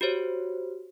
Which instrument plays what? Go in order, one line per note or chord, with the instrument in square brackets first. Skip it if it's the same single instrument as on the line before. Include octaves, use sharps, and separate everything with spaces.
[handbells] F#4 G4 C5 C#5